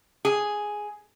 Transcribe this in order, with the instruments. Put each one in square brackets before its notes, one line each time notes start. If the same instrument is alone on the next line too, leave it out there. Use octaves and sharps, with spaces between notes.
[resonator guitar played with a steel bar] G#4